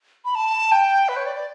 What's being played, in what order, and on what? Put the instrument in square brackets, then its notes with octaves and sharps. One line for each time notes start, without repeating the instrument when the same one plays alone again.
[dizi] B5
A5
G5
B4
C#5
D5
D5